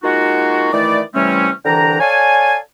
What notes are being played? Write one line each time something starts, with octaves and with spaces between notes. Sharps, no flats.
G#3 A#3 D#4 F4 F#4
D#3 E3 A3 E4 D5
C3 E3 G3 A3 C4 C#4
C2 D3 E3 D4 G5 A#5
A4 C#5 D5 F5 G#5